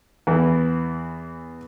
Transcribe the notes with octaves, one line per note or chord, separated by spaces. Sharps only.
E2 E3